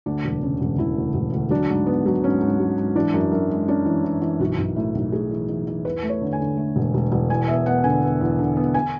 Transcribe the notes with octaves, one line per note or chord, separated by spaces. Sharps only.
D2 D4
E1
C#3
E1
E1 E4
D2
E1
D2
F#3 D4
G#2
B3
F#3
G#2 C#4
G#2
F#3
G#2
E3 D4
F#2
F#2
G#3
C#4 D4
E3
E3
E3
B1 F#4
B1
A2
B1
A2 G#4
E3
E3
E3
E2 B4
A3
C#5
D3
G#5
D3
A3
E1
E1
E1
E2 G#5
B3 E5
B3 F#5
D3 G#5
B3
E2
D3
B3
G#5